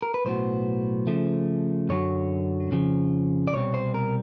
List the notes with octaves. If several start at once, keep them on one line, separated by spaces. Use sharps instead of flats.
A#4
B4
B1 A2 F#3 B3 C5
C#3 F3 A3
F#2 D3 F#3 C#5
F2 C#3 F3
D5
C2 B2 G3 C4 C#5
C5
A#4